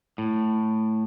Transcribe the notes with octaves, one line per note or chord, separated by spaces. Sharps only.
A2